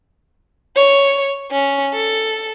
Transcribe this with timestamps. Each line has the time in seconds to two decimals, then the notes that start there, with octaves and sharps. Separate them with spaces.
0.75 C#5
1.50 C#4
1.93 A4